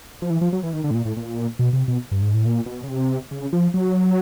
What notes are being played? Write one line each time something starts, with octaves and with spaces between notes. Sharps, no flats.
F3
E3
F3
F#3
E3
D#3
D3
A2
A#2
A2
A#2
B2
C3
B2
G2
G#2
A2
A#2
B2
C#3
C3
C#3
F3
F#3